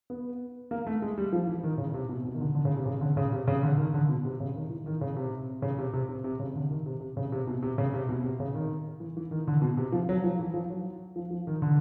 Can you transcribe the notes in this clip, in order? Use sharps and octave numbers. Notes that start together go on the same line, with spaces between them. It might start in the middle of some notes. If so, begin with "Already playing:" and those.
B3
A#3
A3
G#3
G3
F3
E3
D#3
C#3
C3
B2
B2
D#3
D3
D3
C#3
C3
C#3
D3
C#3
C3
C#3
D3
D#3
D3
B2
C3
C#3
D#3
E3
D#3
C#3
C3
C#3
C3
C3
C3
C3
C#3
D3
D#3
C3
C3
C#3
C3
B2
C3
C#3
C3
B2
C3
C#3
D#3
E3
E3
D#3
D3
B2
C3
F3
F#3
F3
E3
F3
F#3
F3
F3
D#3
D3